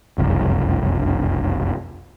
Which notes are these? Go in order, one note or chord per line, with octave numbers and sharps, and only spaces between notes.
F#1 C2 F2